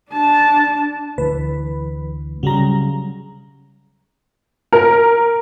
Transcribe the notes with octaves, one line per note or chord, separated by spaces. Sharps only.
D4 A5
D2 E3 B4
C#3 F#3 G3 A#5
A#4